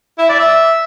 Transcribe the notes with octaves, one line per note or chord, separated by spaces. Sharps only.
E4
D5
E5